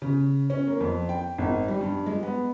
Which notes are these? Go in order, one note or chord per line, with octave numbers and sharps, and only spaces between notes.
C#3
C#4
A#3
F2
G5
G#1
G3
G2
G#3
B3